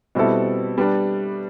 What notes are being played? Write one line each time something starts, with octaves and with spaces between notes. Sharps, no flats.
B2 G3 C4 E4 A4
G3 B3 D4